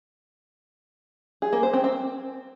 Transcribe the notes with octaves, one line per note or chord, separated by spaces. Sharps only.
G#4
A#3
C5
C4
C4